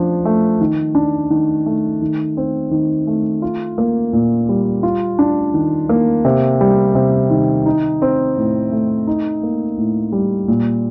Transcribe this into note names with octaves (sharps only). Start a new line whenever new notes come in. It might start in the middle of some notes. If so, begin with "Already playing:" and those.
Already playing: F3 D4
A3
D#3
D4
D#3
A3
D#3
C4
D#3
A3
F4
A#3
A#2
G3
F4
D4
D#3
A#3
C3
G3
C3
D#3
D#4
C4
A2
A3
D#4
A#3
A2
G3
A#2